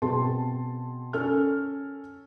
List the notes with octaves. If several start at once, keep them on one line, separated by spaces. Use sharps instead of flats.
B2 C4 G#4 A5 C6
C#4 A4 F6